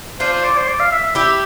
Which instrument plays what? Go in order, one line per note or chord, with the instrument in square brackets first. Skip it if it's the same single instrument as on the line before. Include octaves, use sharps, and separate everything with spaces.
[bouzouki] D4 F4 [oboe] C5
[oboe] C5
D5
C5
D5
F5
E5
E5
[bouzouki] E4 G4 [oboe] E5